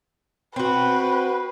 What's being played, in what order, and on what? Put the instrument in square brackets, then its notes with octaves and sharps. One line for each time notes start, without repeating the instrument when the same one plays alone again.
[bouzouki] C4 F#4 [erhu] B4